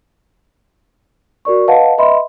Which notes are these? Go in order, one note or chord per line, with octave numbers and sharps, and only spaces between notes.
F#4 A#4 D5 C#6
B4 D#5 F5 F#5 A5
B4 D#5 E5 B5 C6